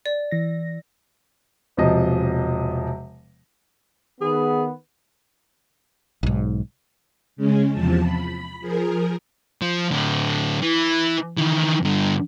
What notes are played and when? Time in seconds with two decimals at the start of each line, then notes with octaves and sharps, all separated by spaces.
0.06 D5
0.31 E3 A#6
1.77 E1 C3 F3 D#5
4.21 D#3 B3 G#4
6.23 B1 G#2
7.36 C#3 G#3 C#4
7.72 E2 C3 F3 A5
8.02 B5
8.60 F3 G#4 A#4
9.62 F3
9.91 A2 D3
10.62 E3
11.37 D#3 E3
11.83 G2 D3